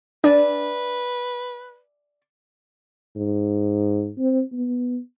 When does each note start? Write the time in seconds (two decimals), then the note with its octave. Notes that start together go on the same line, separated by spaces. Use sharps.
0.24 D4 B4 D5 E5 G#5
3.16 G#2
4.18 C4
4.52 B3